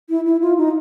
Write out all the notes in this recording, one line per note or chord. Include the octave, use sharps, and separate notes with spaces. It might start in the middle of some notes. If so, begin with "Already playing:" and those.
E4
E4
F4
D#4